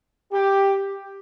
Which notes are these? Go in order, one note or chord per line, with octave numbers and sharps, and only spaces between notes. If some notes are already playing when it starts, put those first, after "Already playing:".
G4